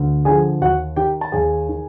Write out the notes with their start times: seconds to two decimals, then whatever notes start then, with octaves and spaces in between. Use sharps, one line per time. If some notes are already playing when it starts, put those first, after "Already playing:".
Already playing: D2
0.25 D3 F3 G#4 G#5
0.61 D#2 F#4 F#5
0.96 D#3 G4 G5
1.21 A5
1.32 D#2 G#4 G#5
1.69 D#3